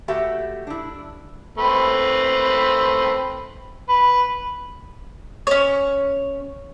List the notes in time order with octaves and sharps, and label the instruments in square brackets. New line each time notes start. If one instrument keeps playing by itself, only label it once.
[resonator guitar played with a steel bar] A3 F#4 G4 E5
D4 E4
[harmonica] A3 C4 B4
B4
[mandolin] C#4 C#5